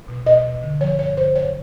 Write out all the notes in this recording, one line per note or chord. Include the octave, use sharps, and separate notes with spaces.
B2
B2 D#5
B2
D3
F3 C#5
G2 C#5
D3 C5
F#3 C#5